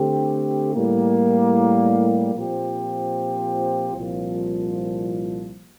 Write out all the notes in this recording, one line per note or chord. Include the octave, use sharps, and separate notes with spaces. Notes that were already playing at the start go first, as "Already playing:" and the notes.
Already playing: D3 A3 C4 G4
A2 G3 A#3
A#2 F3 C4 G4
C2 A#2 F3